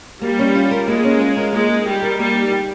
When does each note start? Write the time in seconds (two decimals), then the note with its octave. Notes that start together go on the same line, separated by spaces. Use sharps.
0.21 G3 A#3
0.39 C#4
0.55 F4
0.71 A#4
0.88 G#3 A#3
1.04 C#4
1.21 F4
1.37 A#4
1.53 G#3 A#3
1.69 D#4
1.86 G3 G4
2.03 A#4
2.19 G3 A#3
2.35 D#4
2.52 G4